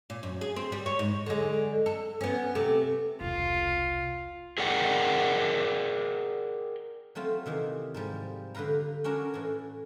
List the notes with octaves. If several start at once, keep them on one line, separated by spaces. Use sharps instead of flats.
A#2
F#2
G#4
C4
G3
C#5
G#2
D3 G#3
A4
B3 C#4
C3 A3
E1 C2 F4
G#4 A#4 D5 F#5 G5
F#3 A3 C4 F4
C3 D#3 E3 F5
G#2 F3 G3
D3 G4 B4 F5 A#5
C#4 D4 F#4 A#4 C#5
A2 E3